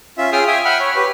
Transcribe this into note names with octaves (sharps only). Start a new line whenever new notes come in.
C#4 F4 E5
C#4 F4 G#4 G5 D#6 F6
E5 G5 G#5 D#6
E5 F#5 G5 B5 F6
C#5
G4 B4